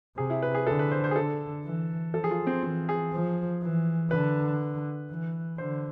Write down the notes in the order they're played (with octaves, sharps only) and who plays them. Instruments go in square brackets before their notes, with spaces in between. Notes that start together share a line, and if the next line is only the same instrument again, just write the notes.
[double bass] C3 [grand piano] G#4
[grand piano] E4
B4
G#4
[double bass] D3 [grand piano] A4
[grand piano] B4
C5
C5
G#4
[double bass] D3 [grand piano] A4
[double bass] E3
[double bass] F3 [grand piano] A4
[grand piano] G#4
F4
C4
[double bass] E3 [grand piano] C4
[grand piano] G#4
[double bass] F3
E3
[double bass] D3 [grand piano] B4
[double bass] E3
[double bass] D3 [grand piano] C5